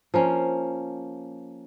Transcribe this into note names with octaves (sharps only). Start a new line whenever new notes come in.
F3 A#3 C#4